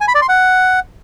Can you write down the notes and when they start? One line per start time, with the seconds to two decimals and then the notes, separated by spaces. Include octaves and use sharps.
0.01 G#5
0.08 B5
0.15 D5
0.22 C6
0.29 F#5